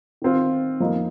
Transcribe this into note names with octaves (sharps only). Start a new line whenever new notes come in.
D#3 C4 F4
F2 F3 A#3 D#4